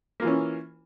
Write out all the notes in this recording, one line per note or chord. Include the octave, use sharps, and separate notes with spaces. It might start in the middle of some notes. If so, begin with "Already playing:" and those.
E3 A#3 C#4 F4